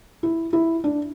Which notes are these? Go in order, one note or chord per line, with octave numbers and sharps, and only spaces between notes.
E4
E4
D4